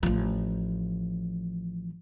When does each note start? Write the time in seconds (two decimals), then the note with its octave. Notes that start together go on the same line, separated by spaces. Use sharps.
0.03 A1 F3